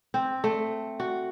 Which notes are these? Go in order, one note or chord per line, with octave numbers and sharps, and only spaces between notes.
C4
A3
F#4